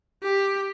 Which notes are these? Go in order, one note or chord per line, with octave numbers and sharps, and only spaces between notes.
G4